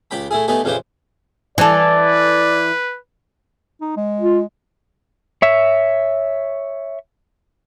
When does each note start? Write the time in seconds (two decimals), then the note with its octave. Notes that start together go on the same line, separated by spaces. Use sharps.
0.11 C#2 G4 G5 B5
0.31 A3 E4 G#4
0.48 A3 B3 D#4 G4 G#5
0.64 F2 C#3 E3 G4 C5
1.58 E3 A4 D5
1.98 B4
3.81 D#4
3.97 G#3
4.20 F4
5.42 C#5 E5